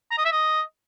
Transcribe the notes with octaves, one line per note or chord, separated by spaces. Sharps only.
A#5
D#5
E5
D#5